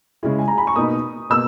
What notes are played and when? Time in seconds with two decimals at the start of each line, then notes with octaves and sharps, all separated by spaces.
0.23 C#3 G#3 C#4 E4 G#4
0.39 G#5
0.48 A#5
0.58 B5
0.67 C#6
0.76 B2 A#3 D#4 D#6
1.30 B2 A#3 E6